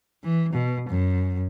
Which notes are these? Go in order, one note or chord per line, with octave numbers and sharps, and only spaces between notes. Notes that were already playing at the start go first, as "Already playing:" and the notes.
E3
B2
F#2